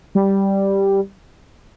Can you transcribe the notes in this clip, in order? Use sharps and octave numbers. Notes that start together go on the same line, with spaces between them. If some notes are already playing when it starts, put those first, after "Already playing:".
G3